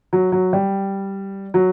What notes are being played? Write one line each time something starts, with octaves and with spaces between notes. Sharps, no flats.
F#3
F#3
G3
F#3